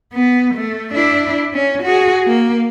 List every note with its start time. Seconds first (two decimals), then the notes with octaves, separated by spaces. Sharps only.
0.14 B3
0.54 A3
0.93 D4 E4
1.54 C#4
1.83 F#4 G#4
2.27 A#3